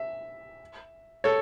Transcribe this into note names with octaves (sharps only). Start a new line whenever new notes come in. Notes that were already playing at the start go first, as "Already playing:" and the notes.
Already playing: E5
A4 C#5